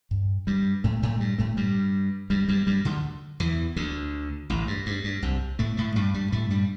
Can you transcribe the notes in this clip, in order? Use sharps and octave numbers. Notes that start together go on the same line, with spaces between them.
G2
G2 G3
A2 A3
A2 A3
G2 G3
A2 A3
G2 G3
G2 G3
G2 G3
G2 G3
D2 D3
E2 E3
D2 D3
A1 A2
G2
G2
G2
C2 C3
A2 A3
A2 A3
G2 G3
G2 G3
A2 A3
G2 G3